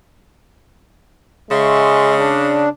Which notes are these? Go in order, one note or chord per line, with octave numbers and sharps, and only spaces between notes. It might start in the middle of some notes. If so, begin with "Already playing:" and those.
C#3 G#3 E5 C6 C#6
D4